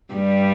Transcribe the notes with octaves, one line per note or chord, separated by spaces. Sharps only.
G2 G3